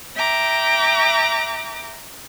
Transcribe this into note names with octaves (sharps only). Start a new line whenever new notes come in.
E5 G5 A#5 D6